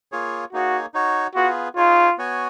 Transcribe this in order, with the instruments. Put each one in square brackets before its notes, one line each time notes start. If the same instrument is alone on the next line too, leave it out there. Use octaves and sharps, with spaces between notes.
[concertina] A#3 F4 G#4 C#5
[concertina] A#3 D#4 G#4 C#5 [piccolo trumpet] F#4
[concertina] D#4 F#4 C#5
[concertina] B3 F4 G#4 B4 [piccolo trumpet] F#4
[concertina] D#4 G#4 C#5 [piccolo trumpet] F4
[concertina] B3 F#4 C#5 G#5